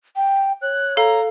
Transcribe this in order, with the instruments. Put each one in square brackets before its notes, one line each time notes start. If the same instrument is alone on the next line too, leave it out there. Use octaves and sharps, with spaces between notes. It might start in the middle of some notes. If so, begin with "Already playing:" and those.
[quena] G5
[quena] C#5 [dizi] F#6
[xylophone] A4 F5 [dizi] A#5